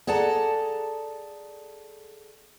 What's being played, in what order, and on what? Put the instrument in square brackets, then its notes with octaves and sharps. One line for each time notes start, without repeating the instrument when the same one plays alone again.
[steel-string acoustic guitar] G#4 A4 D5 F#5 A5 A#5